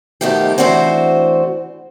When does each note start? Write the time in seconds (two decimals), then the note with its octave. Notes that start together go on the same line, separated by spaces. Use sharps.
0.21 B2 D#3 F3 A3 D#4 G4
0.58 A2 E3 C4 D4 F#4 C5